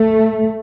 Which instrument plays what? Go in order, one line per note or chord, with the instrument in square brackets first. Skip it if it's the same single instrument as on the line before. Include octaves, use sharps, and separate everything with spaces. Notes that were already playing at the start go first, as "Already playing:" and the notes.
Already playing: [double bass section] A3